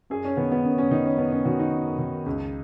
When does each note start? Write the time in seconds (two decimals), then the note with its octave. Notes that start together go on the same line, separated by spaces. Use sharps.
0.10 F#2 G#4
0.25 C#4
0.37 D#3 B3
0.52 B3
0.65 F#2 C#4
0.78 C#4
0.91 D#3 D#4
1.06 C#4
1.18 F#2 B3
1.31 C#4
1.45 D#3 F#4
1.59 D#4
1.72 F#2
1.99 D#3
2.26 C#2